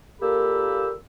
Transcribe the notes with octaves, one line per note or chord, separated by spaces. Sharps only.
A#2 A#3 G4 A4 B5 E6